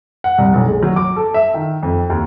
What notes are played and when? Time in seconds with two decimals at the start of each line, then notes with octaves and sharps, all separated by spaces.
0.24 F#5
0.38 C2
0.54 B1
0.68 G#3
0.83 F#3
0.96 D6
1.16 A4
1.34 E5
1.54 D#3
1.83 F2
2.10 D#2